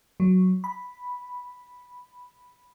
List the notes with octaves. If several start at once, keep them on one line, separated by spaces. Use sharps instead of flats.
F#3
B5